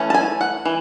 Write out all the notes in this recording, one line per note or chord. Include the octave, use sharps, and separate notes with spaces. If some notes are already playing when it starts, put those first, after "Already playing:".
Already playing: E3 A3 C#4
A5
G#5
F#5
E3